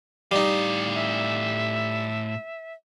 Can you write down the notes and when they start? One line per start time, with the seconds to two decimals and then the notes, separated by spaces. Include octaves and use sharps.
0.31 A2 G3 D#4 F5
0.95 E5